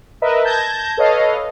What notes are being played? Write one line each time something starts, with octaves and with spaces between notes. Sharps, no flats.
A#4 B4 D#5 E5
A5 G6 G#6 A#6
A4 B4 C#5 D#5 F5